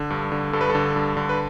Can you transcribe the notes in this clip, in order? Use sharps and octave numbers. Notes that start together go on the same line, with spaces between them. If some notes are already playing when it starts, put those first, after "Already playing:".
Already playing: D3
G2
D3
G2 A4
B4
A4
D3
G2
D3
B4